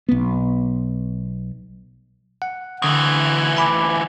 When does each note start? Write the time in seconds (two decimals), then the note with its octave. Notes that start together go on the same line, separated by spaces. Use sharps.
0.09 B1 B3
2.42 F#5
2.82 D2 D3 E3 D#6
3.56 G#5 B5 D6